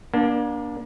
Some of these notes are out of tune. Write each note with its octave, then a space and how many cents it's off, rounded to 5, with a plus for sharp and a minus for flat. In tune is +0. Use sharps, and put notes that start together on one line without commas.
A#3 +35 D4 +0